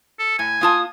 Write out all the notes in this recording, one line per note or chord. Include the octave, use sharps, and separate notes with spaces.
A4
A2 G#5
A#3 F4 A5 D#6